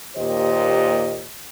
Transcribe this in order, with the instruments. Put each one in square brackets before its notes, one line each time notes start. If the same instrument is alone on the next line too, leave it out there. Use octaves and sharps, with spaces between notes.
[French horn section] D#2 A#2 G4 C5 D#5